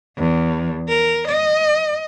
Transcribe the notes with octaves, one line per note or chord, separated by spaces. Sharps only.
E2
A#4
D#5